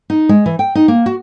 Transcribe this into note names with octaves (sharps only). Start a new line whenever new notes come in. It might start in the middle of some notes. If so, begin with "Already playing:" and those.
D#4
G#3
E3
G5
D#4
A#3
F#4